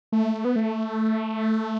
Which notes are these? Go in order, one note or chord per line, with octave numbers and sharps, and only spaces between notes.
A3
B3
A3